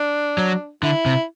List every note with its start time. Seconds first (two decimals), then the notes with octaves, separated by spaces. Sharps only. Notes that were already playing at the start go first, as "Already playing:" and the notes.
Already playing: D4
0.38 F#3
0.83 D3 E4
1.06 C3